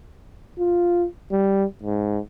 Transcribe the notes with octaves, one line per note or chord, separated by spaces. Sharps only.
F4
G3
G#2